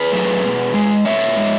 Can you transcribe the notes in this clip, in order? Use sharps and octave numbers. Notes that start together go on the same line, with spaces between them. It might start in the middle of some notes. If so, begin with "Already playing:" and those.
Already playing: G#4 B4
F#3 A3
B2
G#3
B2 C#5 E5
G#3